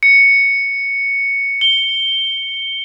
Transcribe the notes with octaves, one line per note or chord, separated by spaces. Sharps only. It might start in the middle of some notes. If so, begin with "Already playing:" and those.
C#7
G7